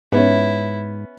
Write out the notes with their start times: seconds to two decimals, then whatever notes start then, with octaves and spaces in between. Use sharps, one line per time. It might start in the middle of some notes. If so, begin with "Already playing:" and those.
0.12 G#2 B3 C#4 E4